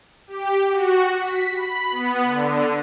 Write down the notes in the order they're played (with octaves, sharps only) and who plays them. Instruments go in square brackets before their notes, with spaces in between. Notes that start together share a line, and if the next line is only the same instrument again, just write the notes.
[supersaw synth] G4
F#4
B6
B5
B3
D3